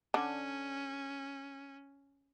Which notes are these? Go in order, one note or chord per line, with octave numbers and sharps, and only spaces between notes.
D3 C#4 D4